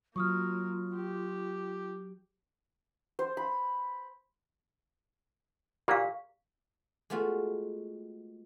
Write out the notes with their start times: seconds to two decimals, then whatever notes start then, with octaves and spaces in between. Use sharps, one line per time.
0.16 F#3 A#3 F4 C#6 D#6 F6
0.96 G4
3.19 C5
3.37 B5
5.88 A#2 A#3 G4 F5
7.10 G#3 A3 B3 F4 F#4